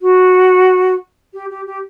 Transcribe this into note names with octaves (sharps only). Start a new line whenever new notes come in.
F#4
G4
G4
G4